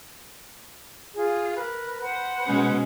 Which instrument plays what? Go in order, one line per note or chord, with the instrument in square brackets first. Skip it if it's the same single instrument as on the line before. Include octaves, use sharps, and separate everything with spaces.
[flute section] F4 G#4
A#4 B4
B4 C5 F#5
[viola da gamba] B2 G#3 C#4